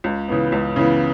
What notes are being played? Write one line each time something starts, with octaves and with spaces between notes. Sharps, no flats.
C#2
C#3 E3 B3
C#2
C#3 E3 B3